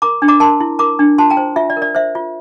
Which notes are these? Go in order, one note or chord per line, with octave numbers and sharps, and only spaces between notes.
A#4 A#5 D6
D4
A#5 D6
A#4 A5 C6
E4
A#4 A#5 D6
D4
F4 A5 C6
G5 A#5
C5
F4 E5
D5
A#4
D5
C5 E5
F4